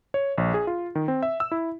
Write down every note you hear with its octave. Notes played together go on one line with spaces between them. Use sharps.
C#5
A#1
G#4
F4
D#3
C4
E5
E6
E4